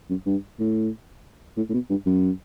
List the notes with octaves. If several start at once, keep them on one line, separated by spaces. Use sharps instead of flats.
F#2
G2
A2
A2
A2
B2
G2
F#2